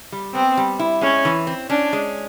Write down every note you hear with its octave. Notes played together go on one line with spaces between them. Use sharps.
G3
B3 C4
G3
E4
G#3 C#4
E3
C4
C#4 D4
G#3